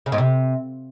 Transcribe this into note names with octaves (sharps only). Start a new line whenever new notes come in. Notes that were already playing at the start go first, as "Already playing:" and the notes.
C#3
G#2
C3